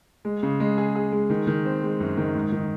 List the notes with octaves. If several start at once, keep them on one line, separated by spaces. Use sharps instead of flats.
G#3
C#3
G#3
G#4
G#4
G#3
D#3
D#3
C4
G#3
F#2
D#3
G#2
D#3